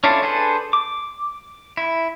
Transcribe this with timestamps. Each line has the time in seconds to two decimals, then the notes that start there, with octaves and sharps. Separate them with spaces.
0.04 C#4 D4 E4 F4 A4
0.22 D4 G#4 A4 B4 C5
0.73 D6
1.77 E4